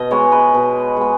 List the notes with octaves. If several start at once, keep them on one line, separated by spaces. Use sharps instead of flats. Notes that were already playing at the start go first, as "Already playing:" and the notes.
Already playing: B2 D#5
G#3 B3 C#5
B4
B2
G#3 B3